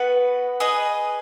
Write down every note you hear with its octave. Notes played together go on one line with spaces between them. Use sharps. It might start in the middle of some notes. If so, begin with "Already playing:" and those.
Already playing: B3 F#4 B4
G#4 B4 D#5